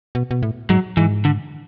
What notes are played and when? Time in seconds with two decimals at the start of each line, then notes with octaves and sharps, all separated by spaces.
0.15 B2
0.31 B2
0.43 A2
0.69 G#2 F#3
0.97 G#2 E3
1.25 D3